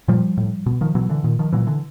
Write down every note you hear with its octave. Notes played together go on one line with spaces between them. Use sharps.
A#2 F3 G3
A2
B2
D#3 F3
B2 E3 F#3
D3 E3
A#2 D#3
D#3 F3
A#2 E3 F#3
D3 E3